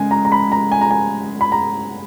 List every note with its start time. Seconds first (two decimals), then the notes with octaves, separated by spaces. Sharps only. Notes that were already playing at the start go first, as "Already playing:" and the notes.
Already playing: C#3 G#3 G#5
0.11 A#5
0.25 A#5
0.32 B5
0.52 A#5
0.72 G#5
0.81 A#5
0.91 G#5
1.41 B5
1.52 A#5